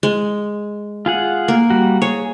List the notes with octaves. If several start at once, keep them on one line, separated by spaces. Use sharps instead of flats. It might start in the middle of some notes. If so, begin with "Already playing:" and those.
G#3
F4 G#4 F#5
A#3
G3 F#4
G#4 C#5